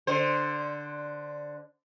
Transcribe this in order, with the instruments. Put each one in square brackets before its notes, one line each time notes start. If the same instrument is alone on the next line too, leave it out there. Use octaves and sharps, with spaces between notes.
[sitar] D3 C5